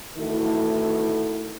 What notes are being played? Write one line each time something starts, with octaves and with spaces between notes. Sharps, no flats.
D#3 E3 A3 E4 F#4 A4